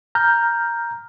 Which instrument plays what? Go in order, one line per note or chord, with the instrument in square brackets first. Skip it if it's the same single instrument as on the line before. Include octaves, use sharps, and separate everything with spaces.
[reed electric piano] A#5 F6 G6